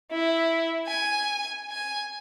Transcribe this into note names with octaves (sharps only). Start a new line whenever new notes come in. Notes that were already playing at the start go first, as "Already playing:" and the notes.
E4
G#5
G#5